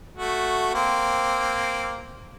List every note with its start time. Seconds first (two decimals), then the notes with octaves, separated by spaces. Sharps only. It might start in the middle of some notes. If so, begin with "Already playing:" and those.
0.16 A3 F#4
0.74 A#3 C4